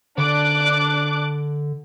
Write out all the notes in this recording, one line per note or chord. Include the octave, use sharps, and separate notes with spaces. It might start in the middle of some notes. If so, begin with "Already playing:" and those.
D3 D4 D6 F#6